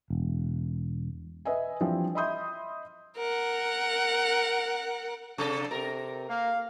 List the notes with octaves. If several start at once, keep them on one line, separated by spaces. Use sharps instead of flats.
E1
B4 D#5 E5 G#5
E3 F3 G3 C4 D4
D#5 E5 B5 C6 D#6 G6
A#4 F#5
C3 D4 A4
C3 A#4
A#3 F5